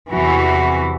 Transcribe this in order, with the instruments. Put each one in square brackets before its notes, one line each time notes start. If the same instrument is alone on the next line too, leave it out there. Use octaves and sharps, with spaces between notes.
[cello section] E2 C3 E3 F#4